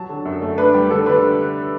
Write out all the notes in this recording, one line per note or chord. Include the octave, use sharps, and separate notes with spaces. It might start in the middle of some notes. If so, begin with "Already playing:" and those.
Already playing: F#3 A5
D3
F#2
A3
D4 B4
G3 G4
D3 A4
D3 B4